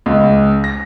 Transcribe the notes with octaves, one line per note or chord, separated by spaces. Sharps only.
C#2
A#6